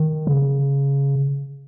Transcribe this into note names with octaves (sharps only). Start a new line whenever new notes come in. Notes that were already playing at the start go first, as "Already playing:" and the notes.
Already playing: D#3
C#3